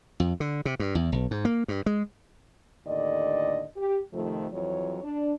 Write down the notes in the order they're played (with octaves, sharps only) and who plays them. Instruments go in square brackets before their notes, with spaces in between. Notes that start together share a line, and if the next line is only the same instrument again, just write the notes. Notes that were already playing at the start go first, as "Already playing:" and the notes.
[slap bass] F2
D3
C3
G2
E2
B1
G#2
A#3
G2
G#3
[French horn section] D#2 A2 D3 D5 D#5
G4
F2 C3 D#3 F3 A3
F2 E3 F#3 C#5
D4